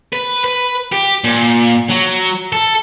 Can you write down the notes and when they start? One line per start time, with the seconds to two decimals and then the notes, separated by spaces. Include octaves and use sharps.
0.13 B4
0.44 B4
0.92 G4
1.24 A#2
1.90 F#3
2.53 A4